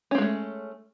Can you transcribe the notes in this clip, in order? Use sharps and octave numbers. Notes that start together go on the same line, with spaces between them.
G#3 A3 C4 C#4